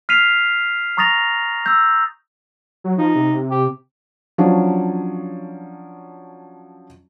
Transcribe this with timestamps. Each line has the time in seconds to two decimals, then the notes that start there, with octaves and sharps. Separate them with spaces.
0.09 F6 B6 C7 D#7 F7
0.97 A#5 C#6 D#6 A6 A#6 F7
1.66 E6 G6
2.84 F#3
2.98 F3 D#4
3.15 C3
3.51 G4
4.38 F3 F#3 C#4 D4